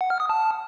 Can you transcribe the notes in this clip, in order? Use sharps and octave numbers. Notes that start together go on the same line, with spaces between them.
F#5
F6
D#6
A5